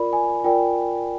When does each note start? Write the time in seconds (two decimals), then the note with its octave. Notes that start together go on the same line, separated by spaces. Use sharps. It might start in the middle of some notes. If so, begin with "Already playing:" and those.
Already playing: F4 A#4 D5 B5
0.13 G#5
0.44 F4 A#4 D5 G5